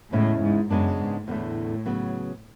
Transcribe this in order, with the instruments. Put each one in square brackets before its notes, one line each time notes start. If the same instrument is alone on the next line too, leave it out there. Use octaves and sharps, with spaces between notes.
[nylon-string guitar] E2 C#3 G#3 C#4 E4 [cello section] A2
[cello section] G#2
[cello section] F#2 [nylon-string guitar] C#3 G#3 B3 D4
[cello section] G#2
[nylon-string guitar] E2 D3 A3 [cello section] A2
[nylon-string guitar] C#3 F#3 B3